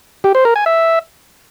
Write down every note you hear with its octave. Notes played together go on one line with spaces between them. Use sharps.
G4
C5
A#4
G#5
E5